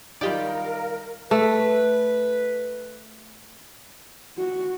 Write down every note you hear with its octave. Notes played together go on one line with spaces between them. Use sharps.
D#3 G3 F4 G4 A#4 D5 F5
A3 B4
F#4